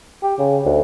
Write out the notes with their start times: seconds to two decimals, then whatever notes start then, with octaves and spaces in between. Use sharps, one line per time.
0.23 G4
0.39 C#3
0.65 D2